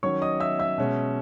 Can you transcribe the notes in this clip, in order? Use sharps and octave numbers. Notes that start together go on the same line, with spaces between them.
D#3 F#3 C#4 C#5 C#6
D#5 D#6
E5 E6
E5 E6
B2 G#3 C#4